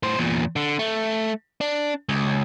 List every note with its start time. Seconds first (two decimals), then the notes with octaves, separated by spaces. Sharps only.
0.03 A2 C5
0.18 E2 A#2
0.56 D3
0.79 A3
1.61 D4
2.09 C#2